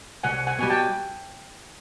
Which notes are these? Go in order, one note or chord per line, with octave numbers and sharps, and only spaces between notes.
C2 F#5 G#5
F#5 G#5
B2 G3 G#5
G5 A5